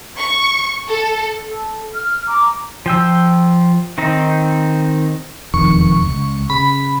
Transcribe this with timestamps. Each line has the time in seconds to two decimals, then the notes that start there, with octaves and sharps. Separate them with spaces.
0.18 C#6
0.88 A4
1.48 A4
1.94 F6
2.27 A#5 D6
2.86 F3 G5 E6
3.98 D#3 C4 D#4
5.54 E1 F2 D#3 C#6
6.06 C#2
6.50 C#3 B5